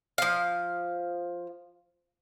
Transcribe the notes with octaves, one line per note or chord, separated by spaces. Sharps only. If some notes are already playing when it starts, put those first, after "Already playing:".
F3 F5